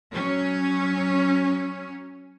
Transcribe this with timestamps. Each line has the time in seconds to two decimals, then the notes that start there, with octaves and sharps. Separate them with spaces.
0.14 F#3 C#4